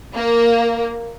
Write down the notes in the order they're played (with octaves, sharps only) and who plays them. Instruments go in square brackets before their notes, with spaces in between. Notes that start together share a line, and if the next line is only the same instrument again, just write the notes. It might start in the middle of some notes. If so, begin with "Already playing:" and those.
[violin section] A#3